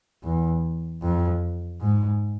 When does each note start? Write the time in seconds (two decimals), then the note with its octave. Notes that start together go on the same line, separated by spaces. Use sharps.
0.24 E2
1.03 F2
1.81 G#2